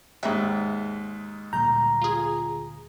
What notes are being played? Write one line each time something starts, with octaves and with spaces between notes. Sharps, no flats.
D#2 G#2 E5
D2 A#2 G3 A#5 G6
F4 G#4